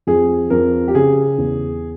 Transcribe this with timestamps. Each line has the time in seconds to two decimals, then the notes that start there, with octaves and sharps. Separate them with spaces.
0.07 F2 G#4
0.50 F2 A#4
0.88 G4
0.95 C#3 G#4
1.38 E2